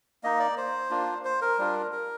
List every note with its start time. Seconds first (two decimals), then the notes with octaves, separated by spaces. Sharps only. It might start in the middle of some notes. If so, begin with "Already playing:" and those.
0.23 A#3 D#4 D#5
0.40 D5
0.57 C5
0.90 A#3 D4 F4
1.25 C5
1.41 A#4
1.59 G3 D4 F4
1.92 A#4